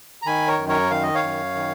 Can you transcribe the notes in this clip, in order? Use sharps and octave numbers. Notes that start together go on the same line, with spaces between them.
A#5
D#3 G#5 B5
A#4 C#5
F#2
A#4 C#5
D#3 F5
D#5
C#5 F5
F#2
D#3